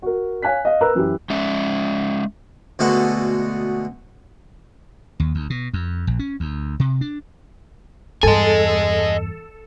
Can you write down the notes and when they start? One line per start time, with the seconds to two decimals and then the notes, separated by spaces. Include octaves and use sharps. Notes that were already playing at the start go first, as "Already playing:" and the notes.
0.02 F#4 A#4
0.42 C#5 F5 G#5 F#6 B6
0.65 D#5 F5
0.81 A#4 B4 A#5 E6 F#6
0.95 F#2 E3 E4 G4
1.30 G#3 C#4 E5
2.79 D2 B2 G#3 F#4 A4 F#5
5.20 D#2
5.35 D2
5.50 B2
5.73 F2
6.07 A#1
6.19 C#4
6.40 D2
6.80 C3
7.01 D4
8.23 E2 G2 A4 D#5 G#5